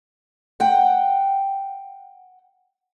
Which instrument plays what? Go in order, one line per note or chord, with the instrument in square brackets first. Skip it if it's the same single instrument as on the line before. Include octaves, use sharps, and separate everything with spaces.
[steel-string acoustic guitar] F#5 G5